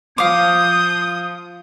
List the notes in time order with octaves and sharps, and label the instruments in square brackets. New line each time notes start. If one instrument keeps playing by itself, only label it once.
[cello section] F3 [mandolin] F5 D6 [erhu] D#6 [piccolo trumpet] G6